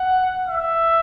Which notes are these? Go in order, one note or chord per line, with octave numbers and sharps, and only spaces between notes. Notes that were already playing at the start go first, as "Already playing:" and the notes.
Already playing: F#5
E5